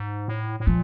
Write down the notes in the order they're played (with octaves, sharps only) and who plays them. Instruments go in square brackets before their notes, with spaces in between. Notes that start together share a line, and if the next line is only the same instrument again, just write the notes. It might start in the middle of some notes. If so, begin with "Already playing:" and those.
Already playing: [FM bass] G#2
A2
A2
[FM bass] A#2 [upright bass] F3